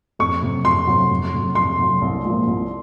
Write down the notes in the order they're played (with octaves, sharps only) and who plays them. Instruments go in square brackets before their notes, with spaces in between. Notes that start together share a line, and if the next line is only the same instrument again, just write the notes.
[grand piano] F2 [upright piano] C#6
[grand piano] C3 F#3
[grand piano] F2 [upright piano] C6
[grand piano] C3 F#3
F2
C3 F#3
[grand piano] F2 [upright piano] C6
[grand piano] C3 F#3
C2
A#2 F3 G#3
C2